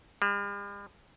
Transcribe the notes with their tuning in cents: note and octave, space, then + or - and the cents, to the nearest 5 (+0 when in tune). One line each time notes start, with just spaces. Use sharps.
G3 +45